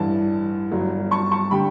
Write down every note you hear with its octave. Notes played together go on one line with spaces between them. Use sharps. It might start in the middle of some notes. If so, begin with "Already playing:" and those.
Already playing: A1 G2 E3 A5
G1 G2 F#3
A5 C#6
A5 C#6
D3 G3 G5 B5